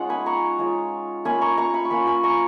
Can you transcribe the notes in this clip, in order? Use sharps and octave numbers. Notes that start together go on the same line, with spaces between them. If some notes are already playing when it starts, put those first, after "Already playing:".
Already playing: G#3 C#4 D#4 F4 F#5
G#5 B5
A#5 C#6
G#3 C#4 F4
A#3 C#4 F4 G#5 B5
A#5 C#6
A#5 C#6
G#5 B5
C#6
A#3 C#4 F4 G#5 B5
G#5 B5
A#5 C#6